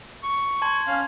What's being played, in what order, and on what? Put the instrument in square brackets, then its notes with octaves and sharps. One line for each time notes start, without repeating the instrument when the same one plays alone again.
[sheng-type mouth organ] C#6
[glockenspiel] A5 C6 G#6
[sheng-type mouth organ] C#4 F5